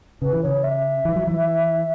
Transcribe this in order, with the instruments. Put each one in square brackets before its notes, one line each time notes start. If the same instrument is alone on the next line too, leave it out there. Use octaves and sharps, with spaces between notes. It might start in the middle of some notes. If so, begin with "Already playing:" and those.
[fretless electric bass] C#3 [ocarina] B4
[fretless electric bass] E3
[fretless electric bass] C#3 [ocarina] C#5
[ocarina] E5
[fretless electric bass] E3
F#3
E3